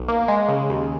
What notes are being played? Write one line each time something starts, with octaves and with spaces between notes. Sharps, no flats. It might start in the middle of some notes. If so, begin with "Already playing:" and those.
Already playing: B1
A#3
G#3
C#3
D#2